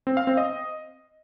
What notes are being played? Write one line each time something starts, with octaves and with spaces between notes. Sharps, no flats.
C4
F5
C4
D#5